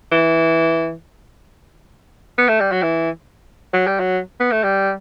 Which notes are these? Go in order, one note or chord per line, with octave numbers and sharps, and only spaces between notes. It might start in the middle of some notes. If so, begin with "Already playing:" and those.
E3
B3
A3
G3
F#3
E3
F#3
G3
F#3
B3
A3
G3